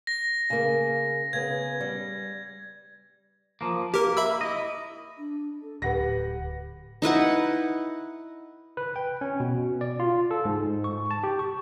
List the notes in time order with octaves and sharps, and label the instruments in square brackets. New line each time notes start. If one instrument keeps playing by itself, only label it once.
[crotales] A#6
[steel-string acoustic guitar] C#3 A#3
[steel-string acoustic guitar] C#3 B3 [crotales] G#6
[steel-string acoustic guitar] G3
[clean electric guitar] F3 A#3
[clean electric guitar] A#3 [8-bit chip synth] G4 A#4
[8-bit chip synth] E5 B5 E6
[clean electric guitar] E4 D#5
[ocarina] D4
A4
[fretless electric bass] D1 [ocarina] G4 [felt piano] B4 F#5 A#6
[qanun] D#4 E4 B4 F#5
[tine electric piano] B4
G5
C#4
B2
D5
F4
A4
G#2
C#6
A5
G4
C#6